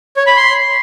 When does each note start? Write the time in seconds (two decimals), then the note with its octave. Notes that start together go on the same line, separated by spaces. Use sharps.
0.17 C#5
0.27 B5
0.37 C6